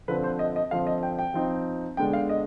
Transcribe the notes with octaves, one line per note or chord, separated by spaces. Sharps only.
D3 F3 C4 B4
C5
D#5
D#5
D3 F3 C4 F5
D#5
G5
G5
F3 C4 D#4
D3 G#3 B3 D4 G5
F5
D#5